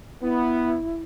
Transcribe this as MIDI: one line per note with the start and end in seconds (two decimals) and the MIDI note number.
0.22 0.75 59
0.22 1.03 64